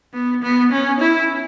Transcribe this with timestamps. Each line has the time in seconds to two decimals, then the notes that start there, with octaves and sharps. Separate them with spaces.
0.14 B3
0.43 B3
0.72 C#4
1.00 E4